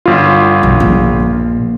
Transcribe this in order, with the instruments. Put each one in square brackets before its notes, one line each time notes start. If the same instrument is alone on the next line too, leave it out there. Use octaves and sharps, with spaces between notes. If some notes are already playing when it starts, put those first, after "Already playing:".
[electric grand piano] G1 F4
[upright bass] B1
A#1 A#3